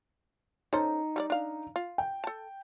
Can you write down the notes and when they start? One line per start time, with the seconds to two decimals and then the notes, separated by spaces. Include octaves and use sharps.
0.73 C#4 D#4 A4 C5
1.16 G3 A4 D5
1.30 D4 F5
1.76 F4
1.98 G5
2.24 A4 A5